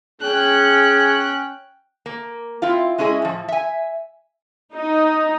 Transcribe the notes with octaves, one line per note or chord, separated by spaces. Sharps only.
C#4 G#4 G5 F#6
A#3
C4 E4 F4
G#3 C#4 E4 G#4 D#5
A2 F3
E5 G#5
D#4